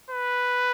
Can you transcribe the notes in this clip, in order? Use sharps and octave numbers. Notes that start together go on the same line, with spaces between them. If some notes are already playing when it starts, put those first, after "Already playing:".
B4